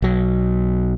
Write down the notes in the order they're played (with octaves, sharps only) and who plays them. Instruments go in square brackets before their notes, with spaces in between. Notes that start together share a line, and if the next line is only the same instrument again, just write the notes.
[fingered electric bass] B1 F#3